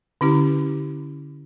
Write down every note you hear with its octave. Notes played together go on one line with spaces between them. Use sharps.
D3 C#4 E4 G4